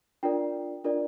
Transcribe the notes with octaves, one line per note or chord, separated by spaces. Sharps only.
D4 F4 A#4 D5 G5
D4 F4 A#4 D5